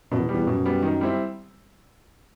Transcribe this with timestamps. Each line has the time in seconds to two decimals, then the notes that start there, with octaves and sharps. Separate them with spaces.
0.12 F#2 B2
0.19 E2
0.29 G3
0.34 E2 B3
0.47 F#2 B2
0.66 G3 B3
0.82 D#3
1.01 G3 C4 E4